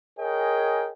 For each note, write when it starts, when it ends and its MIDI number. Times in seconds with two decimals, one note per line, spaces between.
0.20 0.91 68
0.20 0.91 70
0.20 0.91 73
0.20 0.91 75
0.20 0.91 79
0.20 0.91 80